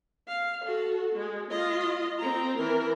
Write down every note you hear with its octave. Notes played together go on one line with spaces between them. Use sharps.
F5
F#4 A4
G#3
F4 D#5
C4 A#5
E3 A#4